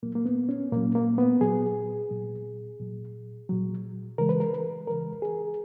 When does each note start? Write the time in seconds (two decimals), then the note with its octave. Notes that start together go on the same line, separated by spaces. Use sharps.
0.03 A#2 F#3 A#3
0.15 A#3
0.26 B3
0.49 C#4
0.72 A#2 F#3 A#3
0.95 A#3
1.18 B3
1.41 A#2 F#3 G#4
2.11 A#2 F#3
2.79 A#2 F#3
3.49 A#2 F#3
4.18 C#3 E3 G#3 A#4
4.29 B4
4.40 A#4
4.53 B4
4.87 C#3 E3 G#3 A#4
5.22 G#4